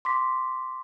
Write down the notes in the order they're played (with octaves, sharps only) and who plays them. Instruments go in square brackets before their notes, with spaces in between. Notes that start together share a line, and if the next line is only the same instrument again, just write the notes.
[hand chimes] C6 D6 B6